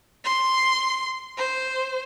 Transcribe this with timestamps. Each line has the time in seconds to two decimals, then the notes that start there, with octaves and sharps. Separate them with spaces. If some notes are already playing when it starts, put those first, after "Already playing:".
0.24 C6
1.37 C5